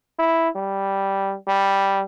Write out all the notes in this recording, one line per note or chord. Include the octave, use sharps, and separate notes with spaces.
E4
G3
G3